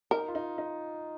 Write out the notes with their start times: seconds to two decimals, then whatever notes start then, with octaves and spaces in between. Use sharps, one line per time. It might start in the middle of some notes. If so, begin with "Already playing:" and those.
0.11 D#4 A#4
0.28 F4
0.35 D#4
0.58 D#4